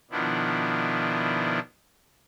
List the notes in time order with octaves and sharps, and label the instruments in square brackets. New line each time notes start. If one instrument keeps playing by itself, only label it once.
[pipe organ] B2 D#3 F3 B3 D4 E4